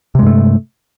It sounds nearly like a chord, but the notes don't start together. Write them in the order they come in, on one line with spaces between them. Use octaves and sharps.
C3 G#3 G2 A3